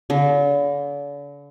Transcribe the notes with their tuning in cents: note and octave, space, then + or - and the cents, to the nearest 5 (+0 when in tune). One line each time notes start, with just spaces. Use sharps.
D3 -45